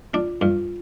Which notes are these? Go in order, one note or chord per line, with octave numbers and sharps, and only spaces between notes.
D4 F4
G2 F4